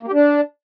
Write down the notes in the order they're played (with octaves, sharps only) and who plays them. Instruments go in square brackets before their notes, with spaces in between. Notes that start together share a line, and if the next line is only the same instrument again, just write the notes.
[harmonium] A#3
G4
D4